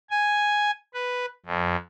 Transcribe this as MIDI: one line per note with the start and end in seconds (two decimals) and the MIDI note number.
0.10 0.71 80
0.94 1.26 71
1.45 1.76 41